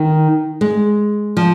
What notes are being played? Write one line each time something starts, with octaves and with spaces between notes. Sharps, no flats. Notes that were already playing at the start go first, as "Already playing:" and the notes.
Already playing: D#3
G#3
F3